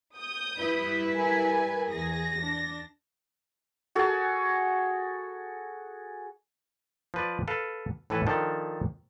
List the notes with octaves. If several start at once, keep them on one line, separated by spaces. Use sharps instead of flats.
D#6 G6
G3 E4 B4
A#4 G#5
E2 G#4 A#6
D4
F#4 G#4 A4
F3 B4 D5
A4 B4 F5
A2 E3 A4 B4
D#3 F3 D4 A4